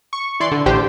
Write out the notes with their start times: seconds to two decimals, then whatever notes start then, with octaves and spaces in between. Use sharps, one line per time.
0.13 C#6
0.40 E3 D5 C6
0.52 D3
0.66 A1 D3 G4 C5 G5